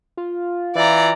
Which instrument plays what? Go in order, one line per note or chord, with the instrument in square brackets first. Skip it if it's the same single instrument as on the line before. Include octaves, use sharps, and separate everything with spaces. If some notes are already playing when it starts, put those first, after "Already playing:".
[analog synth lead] F4
[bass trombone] E3 [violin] D5 A#5